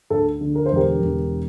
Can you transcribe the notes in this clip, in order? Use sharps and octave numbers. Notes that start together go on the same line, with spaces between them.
D2 A4
D3
A#4
C5
E1 G4 A#4
E1